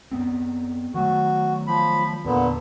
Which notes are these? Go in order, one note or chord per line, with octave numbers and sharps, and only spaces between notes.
F#2 B3 C4
D#3 F#3 A3 F#4
F3 B5
E2 A#2 D3 B3